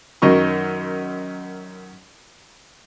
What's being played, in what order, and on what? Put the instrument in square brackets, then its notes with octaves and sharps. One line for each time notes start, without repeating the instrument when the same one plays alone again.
[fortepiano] F#2 D#3 D#4 C#6